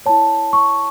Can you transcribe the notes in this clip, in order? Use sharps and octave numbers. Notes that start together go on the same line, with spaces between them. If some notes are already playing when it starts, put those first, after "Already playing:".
E4 C#5 A5
C#6